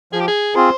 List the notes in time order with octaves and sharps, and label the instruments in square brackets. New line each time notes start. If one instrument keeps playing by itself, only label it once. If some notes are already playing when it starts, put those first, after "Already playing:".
[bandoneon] F3 [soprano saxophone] G#4
[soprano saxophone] G4
G#4
[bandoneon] C4 F4 G#4 [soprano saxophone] C5